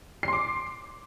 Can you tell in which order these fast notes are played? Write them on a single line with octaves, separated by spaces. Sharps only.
C7 C6 D6